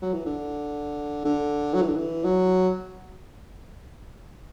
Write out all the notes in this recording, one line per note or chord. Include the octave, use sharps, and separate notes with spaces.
F#3
E3
D3
D3
F#3
E3
D3
E3
F#3